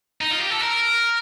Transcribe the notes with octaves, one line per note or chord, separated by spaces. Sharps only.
D#4
F4
G4
A4
A#4